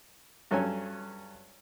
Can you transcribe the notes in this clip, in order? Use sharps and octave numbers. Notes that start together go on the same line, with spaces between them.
G2 F#3 C#4 A4 G#5